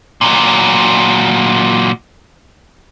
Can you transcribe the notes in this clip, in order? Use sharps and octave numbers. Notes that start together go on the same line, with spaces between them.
A#2 F#3